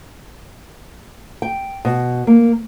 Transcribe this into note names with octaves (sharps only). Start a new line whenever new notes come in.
G5
B2
A#3